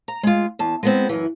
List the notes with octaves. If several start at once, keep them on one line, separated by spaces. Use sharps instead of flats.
A#5
G#3 F4
E2 A5
G#3 B3 C4
F#2 E3